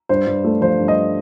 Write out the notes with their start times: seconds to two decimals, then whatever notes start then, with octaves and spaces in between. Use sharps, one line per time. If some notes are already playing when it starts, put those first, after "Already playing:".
0.09 G2 C5
0.27 G2
0.44 A3
0.61 F3 C5
0.80 G2
0.88 D#5